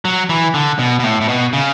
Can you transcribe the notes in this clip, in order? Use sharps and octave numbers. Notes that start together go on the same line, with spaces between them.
F#3
E3
D3
B2
B2
A2
A2
B2
C#3